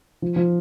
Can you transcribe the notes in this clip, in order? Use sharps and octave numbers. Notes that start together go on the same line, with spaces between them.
F3
F3